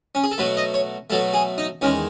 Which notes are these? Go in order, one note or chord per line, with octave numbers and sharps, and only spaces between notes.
C#4
G#4
A4
B2 F#3 A3 B4
D#5
C#5
B2 F#3 A3 A4
G#4
D#4
E2 D#3 G#3 C#4